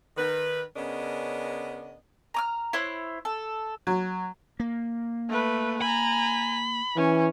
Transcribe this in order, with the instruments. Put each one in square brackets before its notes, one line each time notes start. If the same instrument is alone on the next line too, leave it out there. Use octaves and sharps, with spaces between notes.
[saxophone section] D#3 B4
C#3 B3 C#4 D4 A#4 D#5
[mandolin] A#5 D6 F6
E4 C5 C#5 F#6
A4
[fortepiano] F#3
[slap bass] A#3
[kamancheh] A3 B4
[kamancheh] G#5 A#5 [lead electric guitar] B5
[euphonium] E3 [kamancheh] C#4